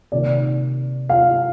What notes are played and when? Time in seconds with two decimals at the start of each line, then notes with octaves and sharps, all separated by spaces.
0.12 C3 D#3 A#3 D5
1.09 F5